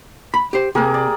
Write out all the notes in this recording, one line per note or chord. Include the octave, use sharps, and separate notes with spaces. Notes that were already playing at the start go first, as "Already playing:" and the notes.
B5
G4 C5
C3 A#3 G4 G#4 A#4
D5